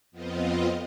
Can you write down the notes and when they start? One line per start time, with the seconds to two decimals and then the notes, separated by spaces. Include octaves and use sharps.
0.11 F2 B3 C4 F4 D#5